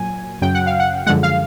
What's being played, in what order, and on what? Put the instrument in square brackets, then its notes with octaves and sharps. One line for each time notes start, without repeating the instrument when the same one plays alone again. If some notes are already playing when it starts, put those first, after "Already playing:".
Already playing: [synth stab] A#2 F#3 G#5
F#2 C#3 F#3 G5
F#5
F5
F#5
F#2 D3 F3 G#3 F#5
F5